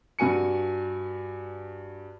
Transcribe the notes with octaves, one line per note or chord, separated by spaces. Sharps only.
G2 F#4 G#5 C#7